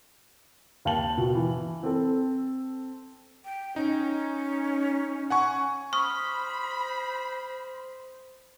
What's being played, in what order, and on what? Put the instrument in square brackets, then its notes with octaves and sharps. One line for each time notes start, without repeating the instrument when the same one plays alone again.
[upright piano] D#2 F5 G5 A5 F#7
B2
E3
C4 A4
[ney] G5
[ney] C#4 [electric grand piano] D#4
[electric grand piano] F#5 G#5 C#6
[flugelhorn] C5 [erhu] B5 [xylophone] C#6 [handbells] D#6 F6